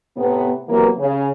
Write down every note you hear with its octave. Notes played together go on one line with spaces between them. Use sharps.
A2 C3 B3
C3 E3 F#3 A#3 B3
C#3